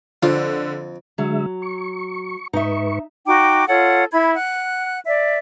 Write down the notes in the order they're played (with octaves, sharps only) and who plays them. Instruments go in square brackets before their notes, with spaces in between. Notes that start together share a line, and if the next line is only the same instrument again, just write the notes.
[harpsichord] F2 [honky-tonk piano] D3 [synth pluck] F4
[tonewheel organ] D3 G#3 E5 [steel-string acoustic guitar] F#3
[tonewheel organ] C#6
[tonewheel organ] G#2 B4 C#6 [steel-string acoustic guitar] D#4 E5
[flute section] D#4 F#4 G5 D6
F4 A4 C#5 F#5
E4 B5 G#6
F#5 F#6
D5 E5